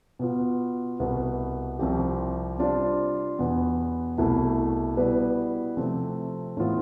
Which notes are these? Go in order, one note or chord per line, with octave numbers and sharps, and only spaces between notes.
B2 B3 F4
C2 B2 B3
C2 C3 F3 C4 G4
C3 G3 D4 F4 C5
E2 B2 B3
C2 B2 A3 E4
B2 G3 B3 E4 B4
C3 F3 A3 C4
A2 E3 B3 F4